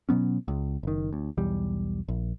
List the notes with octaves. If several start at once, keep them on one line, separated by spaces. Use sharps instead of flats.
B2 F#3 B3 C#4
C#2
F#1 D#3
D2
B1 E2 G3
A#1